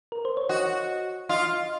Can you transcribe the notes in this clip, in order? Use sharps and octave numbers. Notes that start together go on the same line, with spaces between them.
A#4
C5
C#5
F#4 D#5
F4 D#5